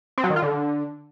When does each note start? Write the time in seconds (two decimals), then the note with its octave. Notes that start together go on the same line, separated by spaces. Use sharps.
0.18 C4
0.24 F#3
0.30 D#3
0.36 F4
0.42 D3